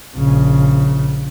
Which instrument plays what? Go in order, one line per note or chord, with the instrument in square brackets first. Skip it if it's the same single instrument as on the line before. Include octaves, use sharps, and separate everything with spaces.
[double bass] A#1 C#3